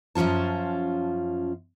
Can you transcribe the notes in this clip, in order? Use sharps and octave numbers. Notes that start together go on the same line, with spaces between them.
F#2 F3 C#4 F4 A5